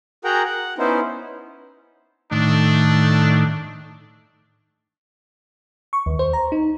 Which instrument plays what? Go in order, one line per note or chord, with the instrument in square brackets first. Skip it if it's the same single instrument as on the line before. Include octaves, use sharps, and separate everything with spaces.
[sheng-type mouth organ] F#4 G#4 A#4 F#5 G5 A#5
F#5
B3 C#4 D#4 E4 C5
[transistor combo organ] A2 D#3 [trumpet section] A3 D4
[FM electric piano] C#6
D#2
C5
A#5
D#4